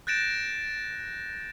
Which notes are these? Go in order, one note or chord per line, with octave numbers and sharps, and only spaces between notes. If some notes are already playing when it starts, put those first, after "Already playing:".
F#6 G6 A6 A#6 D7 E7